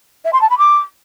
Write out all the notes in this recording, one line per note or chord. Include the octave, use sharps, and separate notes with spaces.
E5
C6
A5
B5
D6